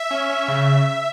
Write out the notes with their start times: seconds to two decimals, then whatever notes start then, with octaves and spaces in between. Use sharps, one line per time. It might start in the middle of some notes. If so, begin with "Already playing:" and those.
Already playing: E5
0.11 C#4
0.29 C#4
0.48 C#3